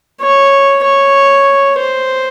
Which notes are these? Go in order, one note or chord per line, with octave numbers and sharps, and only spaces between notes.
C#5
C#5
C5